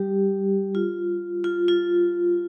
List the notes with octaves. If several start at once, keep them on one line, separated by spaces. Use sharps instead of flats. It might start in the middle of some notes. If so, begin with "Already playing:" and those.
Already playing: G3 G4
F4
F4
F4